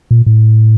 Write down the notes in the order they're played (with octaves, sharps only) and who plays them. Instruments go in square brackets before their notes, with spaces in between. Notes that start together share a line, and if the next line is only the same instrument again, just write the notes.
[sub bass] A#2
A2